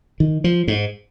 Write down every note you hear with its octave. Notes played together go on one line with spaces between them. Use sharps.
D#3
F3
G#2